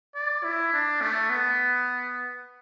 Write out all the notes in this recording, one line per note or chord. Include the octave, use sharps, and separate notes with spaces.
D5
E4
D4
A3
B3